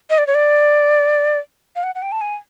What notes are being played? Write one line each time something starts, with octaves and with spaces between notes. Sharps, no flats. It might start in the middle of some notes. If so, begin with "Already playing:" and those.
D#5
D5
C#5
D5
F5
F#5
F#5
G5
A5
G#5